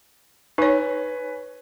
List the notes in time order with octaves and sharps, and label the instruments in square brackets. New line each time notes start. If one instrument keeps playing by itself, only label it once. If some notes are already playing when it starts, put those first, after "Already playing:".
[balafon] D#4 C#5 [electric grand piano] B4 G#5